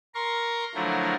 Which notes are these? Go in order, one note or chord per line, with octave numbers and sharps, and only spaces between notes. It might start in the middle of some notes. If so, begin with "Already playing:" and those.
A#4 A#5 C6 C#6
D3 F3 F#3 A3 E4 A#4